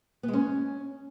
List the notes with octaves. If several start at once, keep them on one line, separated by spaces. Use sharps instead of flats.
B3
G#3
C#4